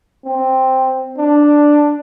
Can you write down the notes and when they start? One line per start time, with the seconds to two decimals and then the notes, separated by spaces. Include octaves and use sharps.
0.25 C4
1.17 D4